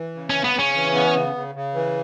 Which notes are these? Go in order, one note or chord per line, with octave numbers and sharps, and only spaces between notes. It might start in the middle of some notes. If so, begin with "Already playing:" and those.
Already playing: E3
C#3
C#3 C#4
B3
C#3
C#4
E3
B3
C#3
C#3
C#3
E3